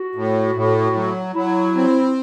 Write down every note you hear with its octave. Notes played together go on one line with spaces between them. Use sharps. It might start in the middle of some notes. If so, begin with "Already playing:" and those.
Already playing: F#4
A2
A2
F#3
F#3 E4
C4